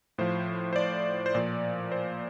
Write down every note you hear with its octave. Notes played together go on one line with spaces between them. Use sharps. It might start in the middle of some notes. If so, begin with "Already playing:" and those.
A2 F3 C5
C5
D5
C5
A#2 F3 D5
C5